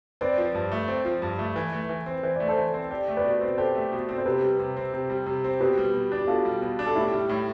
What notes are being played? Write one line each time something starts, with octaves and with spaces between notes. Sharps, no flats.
C4 B4 D5
F3
G2
A3
C4
F3
G2
A3
E3
A3
E3
C4
E3 C5
A3 D5
A4 C5
E3
C4
G4 D5
A3
B4 D5
B2
C4
G4 A4 C5
A3
B2
C4
C5
C3 G4 B4
G3
C3
C4
C3
G3
C3
C4
B2 G4 B4
G3
B2
D4
G4
B2 F4 A4
G3
B2
D4
A4
A2 E4 G4
G3
A2